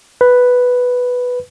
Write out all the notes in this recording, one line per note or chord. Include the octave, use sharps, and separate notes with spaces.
B4